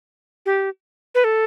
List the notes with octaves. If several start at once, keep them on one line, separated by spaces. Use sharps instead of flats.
G4
B4
A4